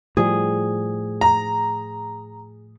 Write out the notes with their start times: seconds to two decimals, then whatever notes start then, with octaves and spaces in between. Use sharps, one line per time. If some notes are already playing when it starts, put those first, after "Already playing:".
0.17 A2 F3 G3 G#4
1.21 A#5